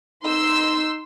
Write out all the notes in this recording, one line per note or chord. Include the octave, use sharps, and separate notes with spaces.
D#4 C6 E6